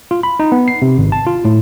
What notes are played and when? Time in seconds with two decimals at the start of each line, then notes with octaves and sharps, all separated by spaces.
0.11 F4
0.23 B5
0.40 D#4
0.52 B3
0.68 C7
0.82 C3
0.98 G#1
1.12 A5
1.27 F4
1.45 A2